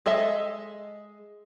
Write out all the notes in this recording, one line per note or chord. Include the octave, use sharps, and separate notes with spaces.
G#3 A4 D#5 E5